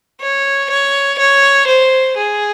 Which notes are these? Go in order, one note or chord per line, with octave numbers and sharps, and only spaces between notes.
C#5
C#5
C#5
C5
G#4